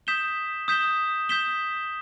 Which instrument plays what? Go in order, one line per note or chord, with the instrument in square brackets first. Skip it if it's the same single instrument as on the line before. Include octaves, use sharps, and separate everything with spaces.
[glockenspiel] D#6 G6 B6 E7 G7
D#6 G6 B6 E7 G7
D#6 G6 B6 E7 G7